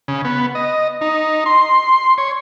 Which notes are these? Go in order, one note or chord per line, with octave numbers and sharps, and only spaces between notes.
C#3
B3
D#5
D#4
C6
C#5